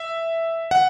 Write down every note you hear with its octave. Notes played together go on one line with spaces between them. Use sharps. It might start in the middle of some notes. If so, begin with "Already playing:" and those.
Already playing: E5
F#5